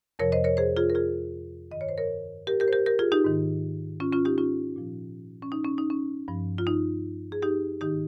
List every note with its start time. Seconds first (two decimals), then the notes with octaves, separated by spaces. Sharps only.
0.19 F2 C3 F3 A#4 C#5
0.32 C5 D#5
0.44 A#4 C#5
0.57 G#4 C5
0.77 F4 G#4
0.90 A#4
0.95 F4 G#4
1.71 G2 D#3 D#5
1.81 C#5
1.89 C5
1.98 A#4 C#5
2.47 G4 A#4
2.60 G4 A#4
2.68 C5
2.73 G4 A#4
2.86 G4 A#4
2.99 F4 G#4
3.12 D#4 G4
3.24 G#2 D#3
4.00 C#4 F4
4.12 C#4 F4
4.25 D#4 G4
4.38 C#4 F4
4.76 A#2 F3
5.42 C#4
5.52 D#4
5.65 C#4
5.78 D#4
5.90 C#4
6.28 G2 F3
6.58 F4
6.67 D#4
7.32 G#4
7.42 D#4 G4
7.80 G#2 D#3 D#4 G4